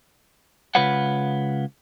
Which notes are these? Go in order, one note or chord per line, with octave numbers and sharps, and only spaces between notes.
C#3 G#3 F4 B4 C#5 F#5